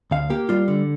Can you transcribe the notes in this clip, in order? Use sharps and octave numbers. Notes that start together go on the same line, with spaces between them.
D2 F5
A#3 G4
G3 F4
D3